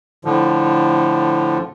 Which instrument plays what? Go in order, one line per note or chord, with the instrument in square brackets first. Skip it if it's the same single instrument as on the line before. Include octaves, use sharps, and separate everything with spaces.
[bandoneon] A2 D3 F3